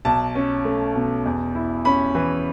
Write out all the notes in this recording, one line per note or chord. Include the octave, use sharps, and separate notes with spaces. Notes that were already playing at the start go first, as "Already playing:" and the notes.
B1 A5
C#4
A3
B2
E2
E4
C#4 B5
E3